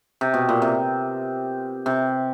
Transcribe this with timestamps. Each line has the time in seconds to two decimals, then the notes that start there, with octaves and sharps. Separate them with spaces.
0.21 C3
0.34 B2
0.49 A#2
0.62 C3
1.86 C3